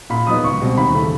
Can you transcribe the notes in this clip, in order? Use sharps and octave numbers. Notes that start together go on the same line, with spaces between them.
A#2 B5
F#3 B3 D#4 D#6
C#2 C#6
B2 G3 C4
D#2 B5
C#3 E3 A3